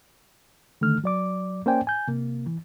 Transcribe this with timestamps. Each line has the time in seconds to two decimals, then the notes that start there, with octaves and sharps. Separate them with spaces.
0.81 D3 D#3 A3 F6
1.04 F#3 D5 D6
1.66 A#3 C#4 C5 D5 G5 G#5
1.87 G#5 G6
2.08 C3 A#3
2.47 E3